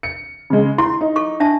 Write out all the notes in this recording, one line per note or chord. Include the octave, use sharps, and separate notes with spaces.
C#7
C#3 G#3
E4 C6
D#4
A4 C#6
D4 E5 A5